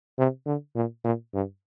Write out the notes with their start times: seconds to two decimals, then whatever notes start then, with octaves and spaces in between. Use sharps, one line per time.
0.18 C3
0.46 D3
0.75 A#2
1.04 A#2
1.34 G2